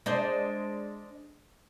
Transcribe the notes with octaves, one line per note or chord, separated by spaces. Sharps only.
G#3 D4 C5